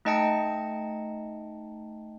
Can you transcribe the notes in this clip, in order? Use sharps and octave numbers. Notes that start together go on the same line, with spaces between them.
A3 D#4 D#5 G5 A5 C#7